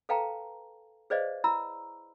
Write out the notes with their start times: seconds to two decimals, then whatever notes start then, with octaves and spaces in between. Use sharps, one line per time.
0.09 A4 B4 F5 G5 A5 A#5
1.10 G#4 B4 C5 D5 D#5 F5
1.44 E4 A#5 B5 E6